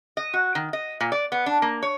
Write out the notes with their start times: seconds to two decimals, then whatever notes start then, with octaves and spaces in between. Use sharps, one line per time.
0.17 D#5
0.34 F#4
0.55 D#3
0.73 D#5
1.01 A#2
1.12 D5
1.32 B3
1.46 D4
1.62 A#3
1.83 C#5